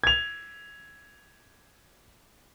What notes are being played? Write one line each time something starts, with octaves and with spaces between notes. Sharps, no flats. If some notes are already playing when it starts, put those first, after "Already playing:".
G#6 F7